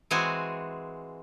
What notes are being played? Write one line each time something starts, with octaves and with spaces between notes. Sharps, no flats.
E3 G#3 C4 F#4 G#4 G#5